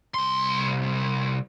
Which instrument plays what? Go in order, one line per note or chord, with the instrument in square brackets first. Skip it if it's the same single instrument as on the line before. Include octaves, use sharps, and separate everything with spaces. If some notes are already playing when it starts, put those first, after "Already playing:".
[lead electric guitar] C2 C6